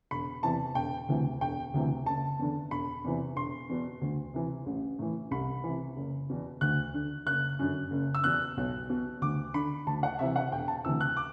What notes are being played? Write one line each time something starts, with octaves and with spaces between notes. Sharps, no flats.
E1 B5
E2 C3 E3 A5
E1 G5
D2 C3 E3
E1 G5
D2 C3 E3
F#1 A5
E2 D3
E1 B5
E2 C3 E3
E1 C6
E2 B2
D2
C3 E3
A1
A2 E3
C2 B5
C3 E3
F#1
E2 B2
D2 F#6
D3
F#1 F#6
F#2 D3
F#1
E6
E2 B2 F#6
B1
B2
D2 D6
D3 B5
D2 A5
F#5
C3 E3 E5
F#5
E1 G5
A5
D2 C3 E3 E6
F#6
D6